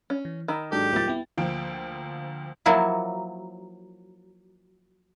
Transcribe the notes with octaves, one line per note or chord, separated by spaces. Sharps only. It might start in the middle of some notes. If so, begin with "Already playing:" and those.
C#4
E3
D#3 A#5 B5 E6
G#2 F#3 D4 G4 A4
C2 F3 G#3 C4 A#4 A6
B3 E4 G5
D2 F3 A#3 G5
F3 F#3 A#3 E4